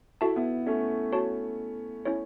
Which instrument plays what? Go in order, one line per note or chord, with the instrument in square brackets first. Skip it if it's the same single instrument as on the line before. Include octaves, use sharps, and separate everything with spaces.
[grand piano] E4 [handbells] F#4 A4 E5 A5
[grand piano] B3 E4
A3 C#4
[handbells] F#4 C#5 A5
C#4 E4 C#5